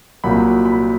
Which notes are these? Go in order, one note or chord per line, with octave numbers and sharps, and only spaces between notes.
C2 A#2 F#3 B5
B5